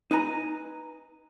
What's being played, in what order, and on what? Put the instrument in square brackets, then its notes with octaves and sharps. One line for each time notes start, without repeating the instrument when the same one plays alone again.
[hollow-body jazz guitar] D#4 B4 G#5 A#5